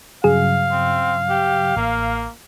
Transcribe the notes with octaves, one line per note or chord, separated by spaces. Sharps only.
G2 C#3 F#3 G#4 F5
C4
G4
A1 A#3